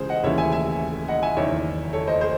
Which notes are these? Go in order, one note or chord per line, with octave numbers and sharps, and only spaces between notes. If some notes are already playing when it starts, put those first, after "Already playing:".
Already playing: C#2 C#3 E3 G#4 C5
D#5 F#5
D#2 C#3 E3 C#5 E5
E5 G#5
E5 G#5
D#5 F#5
E5 G#5
F#1 E2 D#3 C#5 E5
A4 C#5
C5 D#5
G#4 C5